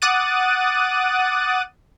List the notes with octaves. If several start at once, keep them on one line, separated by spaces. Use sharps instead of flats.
F#5 D6 D#6 F#6 A6 D#7